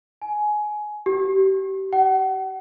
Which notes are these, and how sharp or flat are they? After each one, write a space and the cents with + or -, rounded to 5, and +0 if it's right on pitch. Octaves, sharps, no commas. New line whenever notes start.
G#5 +20
G4 -30
F#5 +40